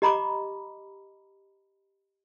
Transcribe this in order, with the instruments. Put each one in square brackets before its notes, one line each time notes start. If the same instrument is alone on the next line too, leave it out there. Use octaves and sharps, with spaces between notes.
[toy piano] G4 D#5 A#5 B5 C#6 D6